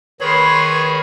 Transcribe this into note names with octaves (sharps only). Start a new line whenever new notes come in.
D#3 G#4 B4 C#5 B5 C6